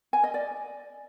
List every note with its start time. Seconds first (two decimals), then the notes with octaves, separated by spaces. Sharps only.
0.13 G#5
0.24 D#5
0.34 D5